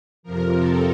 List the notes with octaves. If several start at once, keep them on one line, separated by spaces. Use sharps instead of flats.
F2 C3 F3 A#4
A4